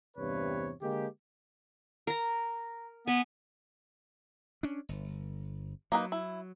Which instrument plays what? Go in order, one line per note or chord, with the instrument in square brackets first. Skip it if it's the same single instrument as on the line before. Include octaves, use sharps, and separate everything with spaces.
[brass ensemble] E2 G2 C3 B4 C#5
D3 G#3 A#3 G4
[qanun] A#4 A#5
[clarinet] B3 [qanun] G#5
[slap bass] C#4 D4
G1
[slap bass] F#3 [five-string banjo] A#3 D#4 B4
[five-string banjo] E4